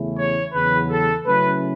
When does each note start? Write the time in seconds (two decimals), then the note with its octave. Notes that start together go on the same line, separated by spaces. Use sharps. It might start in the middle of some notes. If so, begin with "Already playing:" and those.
Already playing: E2 C#3 A3 C#4 E4
0.17 C#5
0.53 E2 C#3 F#3 B4
0.89 A4
1.25 C#3 F#3 A3 C#4 E4 B4